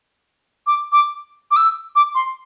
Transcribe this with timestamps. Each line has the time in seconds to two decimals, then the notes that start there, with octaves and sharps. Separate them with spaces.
0.67 D6
0.92 D6
1.51 D6
1.56 E6
1.96 D6
2.15 C6